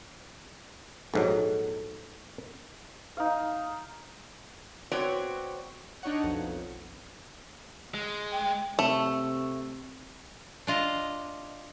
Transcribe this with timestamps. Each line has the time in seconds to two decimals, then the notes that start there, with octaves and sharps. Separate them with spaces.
1.14 A#1 G#2 F#3 A4
3.17 D#4 F5
4.92 B3 C4 F#4 C#5 D5
6.03 D4 D#4 C#5 F#5
6.24 B1 F2
7.94 G#3
8.32 G5
8.79 C3 A3
10.67 D4 F4 D#5